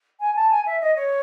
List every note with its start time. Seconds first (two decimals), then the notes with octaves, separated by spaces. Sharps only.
0.20 G#5
0.35 A5
0.50 G#5
0.66 E5
0.80 D#5
0.95 C#5